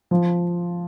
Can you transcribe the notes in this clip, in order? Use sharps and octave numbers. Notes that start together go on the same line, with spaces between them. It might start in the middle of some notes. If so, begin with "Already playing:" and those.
F3